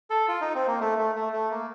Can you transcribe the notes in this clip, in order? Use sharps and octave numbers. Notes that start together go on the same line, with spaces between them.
A4
F4
D#4
C4
A#3
A3
A3
A3
A3
A#3